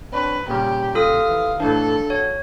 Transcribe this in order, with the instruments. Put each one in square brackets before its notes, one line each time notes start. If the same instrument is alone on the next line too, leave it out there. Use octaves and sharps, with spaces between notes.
[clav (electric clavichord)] C4 D4 C#5 [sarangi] B4
[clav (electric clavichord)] A#2 C#3 G3 [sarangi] G4
[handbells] F4 A4 D#6 [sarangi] F5
[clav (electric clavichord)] E3
[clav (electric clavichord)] A2 E3 [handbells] D4 [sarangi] A4
[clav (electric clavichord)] F#4 [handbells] C#5